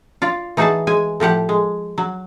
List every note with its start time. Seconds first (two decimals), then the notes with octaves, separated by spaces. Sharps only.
0.22 F4 D5 F5
0.57 E3 D#4 F#4 G#4 F#5 A5
0.87 G#3 G#5
1.20 A2 F3 G4 F#5
1.49 G#3
1.98 F#3